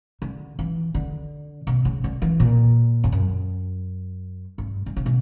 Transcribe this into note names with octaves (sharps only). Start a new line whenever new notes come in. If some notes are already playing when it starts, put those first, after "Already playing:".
D3
E3
D3
B2
C#3
D3
E3
A#2
E2
F#2
G2
D3
C#3
B2